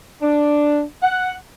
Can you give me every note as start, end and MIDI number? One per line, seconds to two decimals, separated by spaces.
0.22 0.83 62
1.03 1.36 78